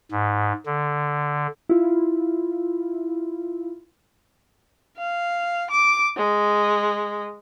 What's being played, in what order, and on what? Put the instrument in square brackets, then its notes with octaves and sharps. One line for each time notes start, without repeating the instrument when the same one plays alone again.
[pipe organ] G#2
D3
[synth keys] E4 F4
[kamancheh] F5
D6
G#3